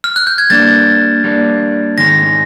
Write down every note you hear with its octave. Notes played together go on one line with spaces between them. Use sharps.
F6
F#6
G6
G#6
G3 A#3 D4 A6
G3 A#3 D4
G#2 D#3 G#3 C#4 A#6